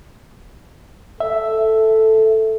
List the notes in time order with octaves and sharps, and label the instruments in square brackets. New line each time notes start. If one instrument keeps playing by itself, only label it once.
[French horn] A4 [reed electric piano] E5